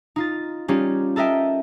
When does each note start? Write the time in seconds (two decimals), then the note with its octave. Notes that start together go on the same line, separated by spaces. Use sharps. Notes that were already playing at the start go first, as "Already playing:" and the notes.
0.16 D#4 F4 A6
0.68 G3 C#4 D#4 F4 G4
1.16 A4 A#4 D#5 E5 G5